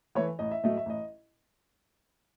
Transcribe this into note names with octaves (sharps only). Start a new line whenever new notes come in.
E3 A3 C#5
A1 D#5
E5
A2 F#3 A3 D#5
E5
A1 D#5